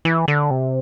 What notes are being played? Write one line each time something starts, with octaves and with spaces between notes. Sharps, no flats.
E3
D3
C3